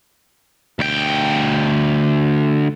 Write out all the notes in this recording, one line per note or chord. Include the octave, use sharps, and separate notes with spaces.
D2 G5